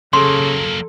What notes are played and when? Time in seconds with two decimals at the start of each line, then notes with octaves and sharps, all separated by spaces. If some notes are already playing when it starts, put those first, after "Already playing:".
0.13 C#3 F#3 A#3 A4 C6